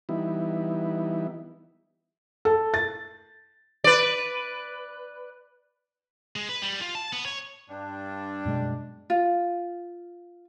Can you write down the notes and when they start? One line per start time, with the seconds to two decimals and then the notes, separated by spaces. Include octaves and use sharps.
0.09 E3 G3 B3 D#4 E4
2.45 A4
2.74 A6
3.84 B4 D5
6.36 G#3
6.49 B4
6.62 G3
6.81 F4
6.95 A5
7.13 B3
7.26 C#5
7.70 G2 D4
8.45 F#2 B2 G#3
9.10 F4